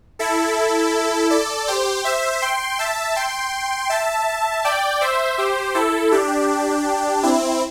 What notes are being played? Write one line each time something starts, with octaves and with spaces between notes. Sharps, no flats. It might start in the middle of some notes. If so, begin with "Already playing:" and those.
E4 A4
A4 D5
G4 C5
C5 E5
G5 C6
E5 A5
G5 C6
E5 A5
D5 G5
C5 E5
G4 C5
E4 A4
D4 G4
C4 E4